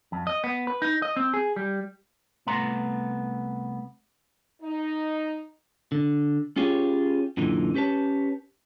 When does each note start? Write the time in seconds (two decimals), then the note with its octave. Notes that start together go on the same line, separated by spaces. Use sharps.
0.12 F2
0.27 D#5
0.44 B3
0.67 B4
0.82 D#4
1.02 D#5
1.16 C4
1.34 G#4
1.56 G3
2.47 C2 A3 B3 A#5 C6
4.63 D#4
5.92 D3
6.56 C#4 F4 G4 G#4 C#5
7.37 F#2 A#2 D3 E3 D#4
7.74 C#4 G4 B4 C#5 A5